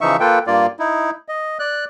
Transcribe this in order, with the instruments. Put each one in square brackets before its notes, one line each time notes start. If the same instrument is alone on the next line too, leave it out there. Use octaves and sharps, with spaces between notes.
[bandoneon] C#3 E3 F3 D#4 E5 C#6
A#3 F4 A4 B4 G5
G2 A#3 F4 D5
D#4 E4
D#5
D5 F#6